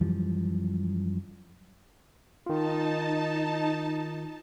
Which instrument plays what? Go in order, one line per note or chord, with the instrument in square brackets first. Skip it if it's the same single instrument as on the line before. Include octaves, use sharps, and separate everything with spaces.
[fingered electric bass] F#2 E3 F3 G3
[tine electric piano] D#3 F4 [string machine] D#4 A5